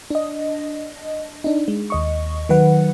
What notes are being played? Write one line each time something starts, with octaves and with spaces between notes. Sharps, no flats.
D4 D#5
D4 D#4
G#3
D#2 D#5 C#6
D#3 F#3 B4 F#5